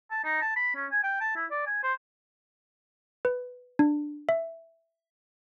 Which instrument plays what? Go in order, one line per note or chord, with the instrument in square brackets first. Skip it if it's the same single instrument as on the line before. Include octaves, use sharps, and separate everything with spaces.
[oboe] A5
D#4
A5
B5
C#4
G#5
G5
A5
E4
D5
G#5
C5
[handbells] B4
D4
E5